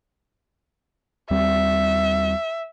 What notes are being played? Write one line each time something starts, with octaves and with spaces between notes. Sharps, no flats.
D#2 G3 C4 E5